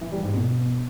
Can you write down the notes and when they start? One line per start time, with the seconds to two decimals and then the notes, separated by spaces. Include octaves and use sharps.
0.01 E3
0.12 G3
0.23 G#2
0.34 B2